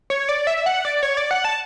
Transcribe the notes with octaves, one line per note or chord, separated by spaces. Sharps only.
C#5
D5
E5
F#5
D5
C#5
D5
F#5
A5